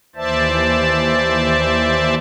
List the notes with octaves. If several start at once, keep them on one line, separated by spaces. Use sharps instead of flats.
D#2 E3 C5 D5 E5 A5